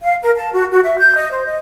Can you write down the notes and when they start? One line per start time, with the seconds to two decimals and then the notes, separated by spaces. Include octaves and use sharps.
0.03 F5
0.22 A#4
0.36 A5
0.53 F#4
0.71 F#4
0.83 E5
0.97 G6
1.15 D#5
1.31 C5
1.46 D#5